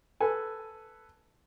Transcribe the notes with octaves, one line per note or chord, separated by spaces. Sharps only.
A4 B4 G#5